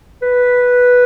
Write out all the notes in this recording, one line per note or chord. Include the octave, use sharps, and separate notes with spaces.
B4